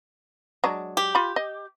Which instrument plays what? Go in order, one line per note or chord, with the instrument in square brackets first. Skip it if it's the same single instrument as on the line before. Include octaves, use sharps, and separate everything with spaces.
[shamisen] F#3 G#3 D4
[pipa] G4
[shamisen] F4 B5
D#5